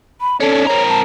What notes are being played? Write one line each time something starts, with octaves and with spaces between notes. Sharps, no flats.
B5
C#4 D4 A4
C4 A#4 C#5
A5